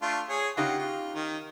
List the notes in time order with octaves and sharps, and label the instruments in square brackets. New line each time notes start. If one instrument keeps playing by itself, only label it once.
[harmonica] A3 D4 F4
G#4 C#5
[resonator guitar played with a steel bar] C#3 D#4 G4 [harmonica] F4 F#5
[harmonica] F4
D#3